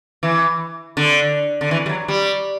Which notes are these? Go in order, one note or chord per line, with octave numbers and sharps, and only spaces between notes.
E3
D3
D3
E3
G3
F#3
G3